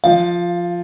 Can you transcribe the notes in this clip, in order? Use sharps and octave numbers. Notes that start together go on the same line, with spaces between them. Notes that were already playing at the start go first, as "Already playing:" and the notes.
F3 F5